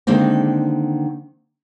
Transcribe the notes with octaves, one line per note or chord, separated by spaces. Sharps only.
D3 D#3 G#3 A#3 C4